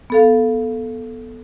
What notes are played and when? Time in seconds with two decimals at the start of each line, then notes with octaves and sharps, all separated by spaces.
0.10 B3 A4 F5